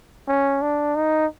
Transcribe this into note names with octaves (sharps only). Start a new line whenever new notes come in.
C#4
D4
D#4